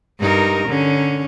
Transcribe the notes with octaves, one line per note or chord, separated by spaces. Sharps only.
G2 D#4 A#4
D3 C#4